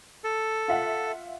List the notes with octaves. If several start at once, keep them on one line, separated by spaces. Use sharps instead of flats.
A4
F4 E5 F#5